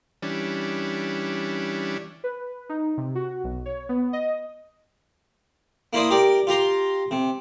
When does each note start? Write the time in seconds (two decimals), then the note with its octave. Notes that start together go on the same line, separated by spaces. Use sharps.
0.22 E3 G3 C#4 D4
2.24 B4
2.69 D#4
2.97 C3
3.15 F#4
3.44 B1
3.66 C#5
3.89 B3
4.13 D#5
5.93 A#3 E4 C5 D5 D#6
6.10 G4 A#4 D5
6.47 F4 G4 A#5 C6
7.11 C3